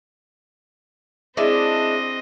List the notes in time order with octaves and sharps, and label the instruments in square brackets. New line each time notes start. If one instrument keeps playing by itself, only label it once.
[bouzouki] G#3 D4 E4 [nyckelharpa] C4 D#5